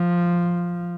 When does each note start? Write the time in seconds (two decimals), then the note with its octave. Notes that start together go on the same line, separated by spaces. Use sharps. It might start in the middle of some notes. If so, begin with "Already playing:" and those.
Already playing: F3